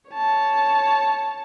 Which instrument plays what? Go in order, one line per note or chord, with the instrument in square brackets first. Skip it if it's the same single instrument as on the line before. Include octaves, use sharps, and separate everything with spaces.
[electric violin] C#5 A5